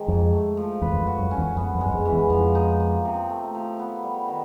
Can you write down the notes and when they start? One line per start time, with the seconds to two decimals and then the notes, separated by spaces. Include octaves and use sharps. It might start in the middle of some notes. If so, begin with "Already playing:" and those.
Already playing: C3 D#3 G#3
0.08 F2 G#2
0.32 A3
0.57 F3
0.82 E2 B4
0.93 E2
1.01 F2
1.07 F#4
1.19 F#2
1.31 C#4
1.38 E2
1.56 F2 B3
1.75 F2
1.81 F#2 G#3
1.94 F2
2.05 E3
2.12 E2
2.30 F2 F3
2.55 D#4
2.80 A#3
3.05 C3
3.30 A3
3.55 F3
3.79 B3
4.03 G3
4.28 D#3